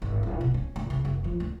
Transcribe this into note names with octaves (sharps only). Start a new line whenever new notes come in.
G#1
D1
B2
C#4
D2
C#3
F#1
F3
D2